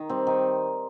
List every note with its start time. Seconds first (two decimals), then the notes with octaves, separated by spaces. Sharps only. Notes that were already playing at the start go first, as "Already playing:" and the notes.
Already playing: D#3
0.09 G3 C4
0.27 D#3